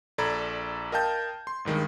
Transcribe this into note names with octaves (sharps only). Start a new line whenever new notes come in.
A#1 A4 D5 A#5 B5 G#6
A#4 D#5 F5 G5 A5 G6
C6
G#1 G2 D#3 G#3